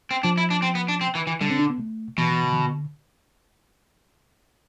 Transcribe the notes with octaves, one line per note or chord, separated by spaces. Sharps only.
C4
F3 D4
E4
D4
C4
B3
D4
C4
E3
E3
D3 G3
C4
D4
B3
A3
B2 E3
E3
D3
E3
D3